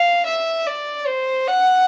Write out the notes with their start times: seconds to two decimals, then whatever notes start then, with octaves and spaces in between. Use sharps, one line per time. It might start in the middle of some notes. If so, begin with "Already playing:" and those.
Already playing: F5
0.26 E5
0.66 D5
1.06 C5
1.47 F#5